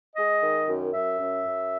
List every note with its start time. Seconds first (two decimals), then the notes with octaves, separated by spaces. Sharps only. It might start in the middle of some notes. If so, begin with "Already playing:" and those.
0.16 G#3 D#5
0.42 D#3
0.68 F#2
0.93 F#2 E5
1.19 F#2
1.45 F#2